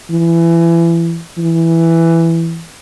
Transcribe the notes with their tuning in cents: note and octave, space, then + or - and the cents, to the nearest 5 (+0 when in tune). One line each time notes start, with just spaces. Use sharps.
E3 +25
E3 +5